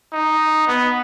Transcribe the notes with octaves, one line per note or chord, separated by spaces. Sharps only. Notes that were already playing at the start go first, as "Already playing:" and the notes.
D#4
B3